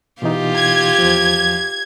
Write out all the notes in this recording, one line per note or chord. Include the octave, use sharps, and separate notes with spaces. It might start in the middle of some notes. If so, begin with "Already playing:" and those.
B2 E3 D#4 F4 G4
G#6
E2 F3